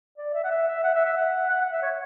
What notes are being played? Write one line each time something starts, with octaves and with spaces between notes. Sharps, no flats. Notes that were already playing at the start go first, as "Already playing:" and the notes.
D5
E5
F#5
E5
E5
F#5
E5
E5
F#5
F#5
F#5
E5
C#5